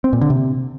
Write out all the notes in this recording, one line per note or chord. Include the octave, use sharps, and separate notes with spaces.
C4
A#2
D3
C3